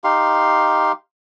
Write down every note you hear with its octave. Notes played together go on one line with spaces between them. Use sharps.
D#4 G4 F5 C6